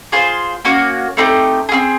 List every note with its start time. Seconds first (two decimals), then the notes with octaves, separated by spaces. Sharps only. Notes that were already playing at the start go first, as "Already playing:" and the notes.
0.12 F4 G#4 C5
0.65 A#3 C#4 F#4
1.17 A3 C4 D#4 G4
1.69 C4 F4 G#4